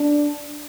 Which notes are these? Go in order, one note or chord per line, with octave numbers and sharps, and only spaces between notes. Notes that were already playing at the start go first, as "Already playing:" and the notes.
Already playing: D4